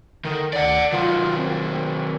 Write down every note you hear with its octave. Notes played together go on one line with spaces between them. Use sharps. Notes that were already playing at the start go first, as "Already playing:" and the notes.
D3 D#3
D2 D5 F#5
D#3 F#3 F4
C4